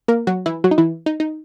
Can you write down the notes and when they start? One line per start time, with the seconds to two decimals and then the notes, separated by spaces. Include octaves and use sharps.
0.08 A#3 A#4
0.27 F#3 F#4
0.46 E3 E4
0.64 F#3 F#4
0.71 D#4
0.78 E3 E4
1.06 D#4
1.20 D#4